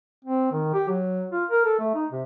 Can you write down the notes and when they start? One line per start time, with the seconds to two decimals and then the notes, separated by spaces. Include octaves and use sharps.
0.25 C4
0.52 D#3
0.74 G4
0.89 F#3
1.31 F4
1.50 A#4
1.65 A4
1.79 A3
1.95 D#4
2.12 C3